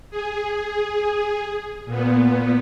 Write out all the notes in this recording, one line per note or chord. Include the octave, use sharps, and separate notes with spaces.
G#4
A#2 B3